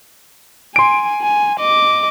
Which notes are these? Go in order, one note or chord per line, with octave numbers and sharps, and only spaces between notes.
G#5 C6 D7
G#5
D#5 D6